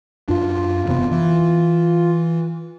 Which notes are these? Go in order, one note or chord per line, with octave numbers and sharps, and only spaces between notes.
F#2 D4 F4
E1 C3 B3
E3